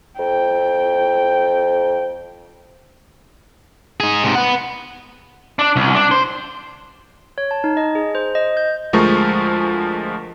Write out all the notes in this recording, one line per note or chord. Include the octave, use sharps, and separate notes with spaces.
F2 G5
D#4 G#4
G#2 C3
B4 F#5
D4
C2
D4
C5
C#5
A5
D#4
D#5
G#4
C5
D#5
G6
D2 F3 G#3 A3 A#4 C#6